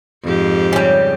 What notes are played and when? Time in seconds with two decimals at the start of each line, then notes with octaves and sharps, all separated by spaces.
0.24 F2 G#2 G4
0.73 C#3 G3